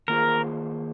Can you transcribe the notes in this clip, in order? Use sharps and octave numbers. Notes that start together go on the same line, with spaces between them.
D#3 A#3 F4 G#4 A#4 C5